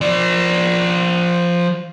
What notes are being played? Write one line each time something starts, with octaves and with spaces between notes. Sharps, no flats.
F3 D5